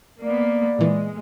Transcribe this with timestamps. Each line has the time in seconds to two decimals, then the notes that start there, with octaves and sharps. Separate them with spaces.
0.21 A#3 B3 D5
0.79 A#2 E3 G#3